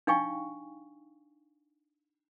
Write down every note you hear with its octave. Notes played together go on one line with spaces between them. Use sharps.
D4 D#4 F5 G5 G#5 C#6